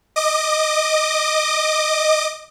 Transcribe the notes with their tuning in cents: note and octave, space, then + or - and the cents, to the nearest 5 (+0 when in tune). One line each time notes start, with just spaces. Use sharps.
D#5 +0 D6 +35